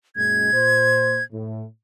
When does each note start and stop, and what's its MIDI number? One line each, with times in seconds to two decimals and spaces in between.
0.16 0.49 42
0.16 0.49 46
0.16 0.49 56
0.16 1.23 92
0.52 1.19 46
0.52 1.19 72
1.32 1.63 45